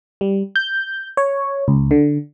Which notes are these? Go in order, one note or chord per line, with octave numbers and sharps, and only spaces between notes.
G3
G6
C#5
C#2
D3